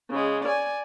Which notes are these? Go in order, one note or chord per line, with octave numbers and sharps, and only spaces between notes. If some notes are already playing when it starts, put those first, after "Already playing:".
C#3 G#3
D5 G#5